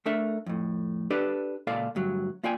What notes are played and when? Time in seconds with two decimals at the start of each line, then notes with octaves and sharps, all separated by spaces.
0.06 A3 D4 A4 A#4 E5
0.46 F2 A2
1.10 D4 G4 A4 B4 D5
1.67 C#2 A#2 A4 D5 F5
1.95 D2 G2 F#3
2.43 A#3 F4 D5 G5 G#5